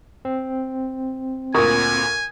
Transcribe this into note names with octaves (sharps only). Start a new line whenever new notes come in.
C4
D2 A#2 A#4 G#5 C#6 D#6